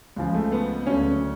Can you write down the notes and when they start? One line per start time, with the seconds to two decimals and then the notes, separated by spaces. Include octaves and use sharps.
0.16 C#2 C#3 F3 G#3
0.35 A3
0.52 B3
0.87 D2 D3 F#3 C#4